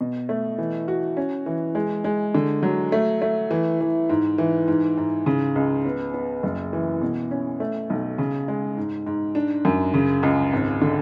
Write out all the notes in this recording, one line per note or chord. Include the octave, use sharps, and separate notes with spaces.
B2
A3
E3
F#4
C#4
E3
G#3
G#3
D3
F#3
A3
A3
E3
E3
G#2
E3
G#2
G#2
C#3
C#2
B3
B3
F#1
E3
B2
C#4
A3
B1
C#3
G#3
G#2
G#2
D4
F#2
C#3
C#2
G#1
D3